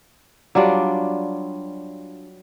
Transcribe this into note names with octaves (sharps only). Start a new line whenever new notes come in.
F#3 G3 D4 F4